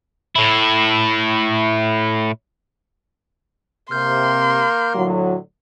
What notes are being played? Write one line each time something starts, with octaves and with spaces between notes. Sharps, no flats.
A2 E4
C3 A#3 C6 F6 G6
A2 D3 F#3